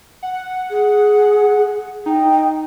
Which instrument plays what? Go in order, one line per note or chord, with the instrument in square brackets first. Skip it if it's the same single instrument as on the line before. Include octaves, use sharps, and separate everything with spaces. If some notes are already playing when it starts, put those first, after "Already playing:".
[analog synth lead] F#5
[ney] G#4
[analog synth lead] D#4 [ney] G5